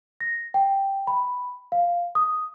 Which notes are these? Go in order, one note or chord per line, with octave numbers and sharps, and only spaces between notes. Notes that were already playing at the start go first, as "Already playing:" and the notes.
A#6
G5
B5
F5
D#6